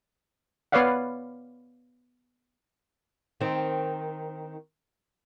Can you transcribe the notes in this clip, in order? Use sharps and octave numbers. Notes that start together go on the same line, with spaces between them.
B3 B4 C#5 D5 F5 F#5
D#3 C4